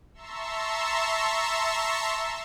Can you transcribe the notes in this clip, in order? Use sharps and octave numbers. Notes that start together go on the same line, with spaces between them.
E5 A5 A#5 C6 C#6 E6